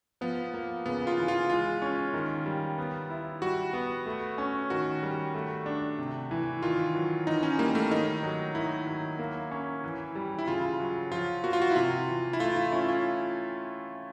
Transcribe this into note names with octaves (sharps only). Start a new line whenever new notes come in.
F3 B3
A#3
C#3 B3
F4
E3
F4
G#3 F4
C#4
D#3
G3
B3
E4
G3 F#4
B3
A3
C#4
D#3 F#4
G3
A3
D4
C3
E3
D#3 F4
F#3
E3 D#4
C#4
G3 A#3
A3
D#3 D#4
F#3
D#3 E4
F#3
A#3
C#4
E3
G3
E4
C#3 F4
F#3
F3 F4
A#3 F#4
F4
F#4
E4
C3 F4
E3
E4
A3 F4
E4
C#4 E4
F4